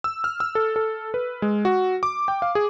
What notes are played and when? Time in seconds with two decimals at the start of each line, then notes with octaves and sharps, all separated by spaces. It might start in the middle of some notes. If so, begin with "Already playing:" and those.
0.04 E6
0.24 F6
0.40 E6
0.55 A4
0.76 A4
1.14 B4
1.42 G#3
1.65 F#4
2.03 D6
2.28 G5
2.42 F5
2.55 G#4